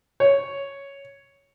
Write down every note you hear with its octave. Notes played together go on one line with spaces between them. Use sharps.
C#5